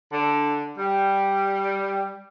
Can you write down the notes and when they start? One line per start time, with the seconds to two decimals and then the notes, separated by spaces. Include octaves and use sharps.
0.13 D3
0.78 G3